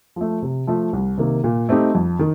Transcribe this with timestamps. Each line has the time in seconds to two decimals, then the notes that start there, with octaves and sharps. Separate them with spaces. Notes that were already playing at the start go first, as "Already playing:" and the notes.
0.16 F3 A3
0.42 C3
0.67 F3 A3
0.93 C2
1.18 C3 D#3 A#3
1.44 A#2
1.69 A3 C4 D#4 G4
1.95 F2
2.19 D#3